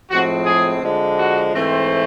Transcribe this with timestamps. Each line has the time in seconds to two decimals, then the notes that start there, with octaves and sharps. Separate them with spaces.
0.10 A2 F3 G#3 C4 F#4
0.46 G#4
0.81 D3 F3 G#3
1.18 F#4
1.53 G#2 E3 A3 C4